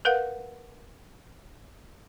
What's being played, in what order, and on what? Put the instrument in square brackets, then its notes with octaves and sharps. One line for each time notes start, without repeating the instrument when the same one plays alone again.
[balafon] A#4 B4 F5 F#5